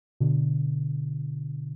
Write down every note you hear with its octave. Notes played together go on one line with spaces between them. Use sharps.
B2 D3